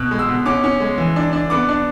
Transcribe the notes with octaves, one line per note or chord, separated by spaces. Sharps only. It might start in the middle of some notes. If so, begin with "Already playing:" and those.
Already playing: B2 F#6
G#3
E6
B2
C#4 D6
C#4
G#3
E3
D4
D4
B3 D6
D4